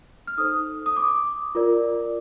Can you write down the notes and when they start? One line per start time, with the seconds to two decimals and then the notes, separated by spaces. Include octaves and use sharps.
0.27 F6
0.37 D#4 A4 C5 D#6
0.86 D#6
0.96 D6
1.55 F4 A#4 D5